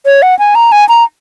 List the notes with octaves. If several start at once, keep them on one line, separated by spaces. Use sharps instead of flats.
C#5
F#5
G#5
A#5
G#5
A#5